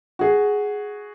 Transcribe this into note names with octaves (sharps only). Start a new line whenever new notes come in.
F#4 G#4